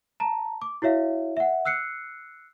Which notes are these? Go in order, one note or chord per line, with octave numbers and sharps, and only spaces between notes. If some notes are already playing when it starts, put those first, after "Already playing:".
A5 A#5
D6
E4 F#4 C#5 E5 F5
E5 F#5
E6 F#6 C7 C#7